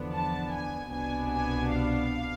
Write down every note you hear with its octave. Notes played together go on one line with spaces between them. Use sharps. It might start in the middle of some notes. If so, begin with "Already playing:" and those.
Already playing: E2 D3 F3 B3 D4
A5
G#5
C2 B2 B3 D4 G#5
G#5
F5